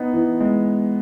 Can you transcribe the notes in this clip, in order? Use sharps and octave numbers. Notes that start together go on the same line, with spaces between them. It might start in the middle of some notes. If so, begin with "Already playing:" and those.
Already playing: B3 D#4
E3
G#3